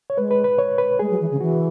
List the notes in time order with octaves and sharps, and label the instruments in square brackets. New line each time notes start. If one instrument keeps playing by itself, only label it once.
[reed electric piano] C#5
[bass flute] G#3 [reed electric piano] B4
[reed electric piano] B4
B4
C#5
B4
[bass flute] G#3 [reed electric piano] G#4
[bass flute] F#3
E3
C#3
[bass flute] E3 [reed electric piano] F#4